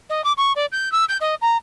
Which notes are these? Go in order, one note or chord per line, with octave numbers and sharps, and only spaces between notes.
D#5
D6
C#6
D5
G6
E6
G6
D#5
A#5